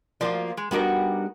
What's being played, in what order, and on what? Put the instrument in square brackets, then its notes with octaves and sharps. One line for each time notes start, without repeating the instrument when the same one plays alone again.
[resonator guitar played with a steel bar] F3 F4 [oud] A#3 F#4 D5
[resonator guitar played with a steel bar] G#3
[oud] G3 D4 D#4 [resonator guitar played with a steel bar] B3 F#4 A#4